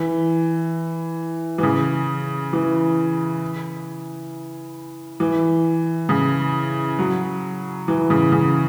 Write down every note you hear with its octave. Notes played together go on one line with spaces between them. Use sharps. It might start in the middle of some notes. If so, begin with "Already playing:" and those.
Already playing: E3
E3
C#3
E3
E3
C#3
F#3
E3
C#3
C#3